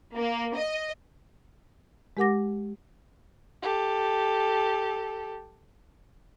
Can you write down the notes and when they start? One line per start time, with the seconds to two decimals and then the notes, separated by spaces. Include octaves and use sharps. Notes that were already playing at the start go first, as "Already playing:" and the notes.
0.14 A#3
0.55 D#5
2.17 G#3 G4 A#4 F#5 D6 A#6
3.62 G4 A4